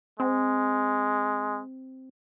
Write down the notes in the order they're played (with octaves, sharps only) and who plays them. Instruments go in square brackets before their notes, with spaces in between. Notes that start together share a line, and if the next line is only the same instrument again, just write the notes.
[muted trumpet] G#3 [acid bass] C4